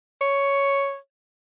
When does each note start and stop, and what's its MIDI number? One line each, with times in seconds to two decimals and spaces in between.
0.21 0.96 73